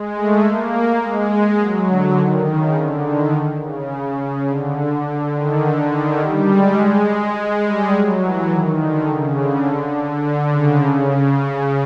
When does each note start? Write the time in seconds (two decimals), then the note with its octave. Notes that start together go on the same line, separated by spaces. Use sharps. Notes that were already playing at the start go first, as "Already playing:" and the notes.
Already playing: G#3
0.16 A3
0.44 A#3
1.02 G#3
1.59 F#3
1.88 D3
2.17 D#3
2.45 C#3
2.75 D3
3.03 D#3
3.60 C#3
4.47 D3
5.34 D#3
5.62 D3
5.91 D#3
6.20 G3
6.49 G#3
6.77 G#3
7.64 G3
7.93 F#3
8.22 E3
8.50 D#3
8.79 D3
9.08 C#3
9.36 D3
10.23 D3
10.51 C#3
11.09 C#3